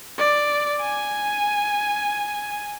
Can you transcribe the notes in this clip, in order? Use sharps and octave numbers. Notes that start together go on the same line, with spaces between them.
D5
G#5